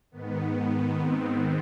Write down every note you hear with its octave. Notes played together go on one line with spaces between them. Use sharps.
G#2 D#3 B3
C4